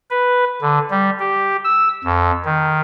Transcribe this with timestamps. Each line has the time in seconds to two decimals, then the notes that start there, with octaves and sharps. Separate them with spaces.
0.10 B4
0.61 D3
0.91 G3
1.19 G4
1.64 E6
2.04 F2
2.45 D#3